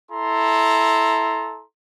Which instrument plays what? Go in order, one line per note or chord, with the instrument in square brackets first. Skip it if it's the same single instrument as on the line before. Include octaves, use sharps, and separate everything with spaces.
[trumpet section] E4 A4 A#5 C6